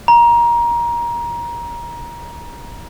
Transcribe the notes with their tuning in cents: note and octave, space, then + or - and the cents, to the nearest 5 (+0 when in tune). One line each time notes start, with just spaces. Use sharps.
A#5 +20